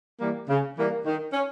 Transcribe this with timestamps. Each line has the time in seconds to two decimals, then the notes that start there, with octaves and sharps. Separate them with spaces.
0.20 E3 G3 A#3
0.49 C#3
0.77 E3 G3 A#3
1.06 D#3
1.33 C#4